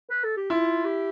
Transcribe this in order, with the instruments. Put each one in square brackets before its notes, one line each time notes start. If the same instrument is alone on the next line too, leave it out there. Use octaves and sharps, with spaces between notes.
[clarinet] B4
A4
G4
[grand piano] E4 [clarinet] F4
[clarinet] G4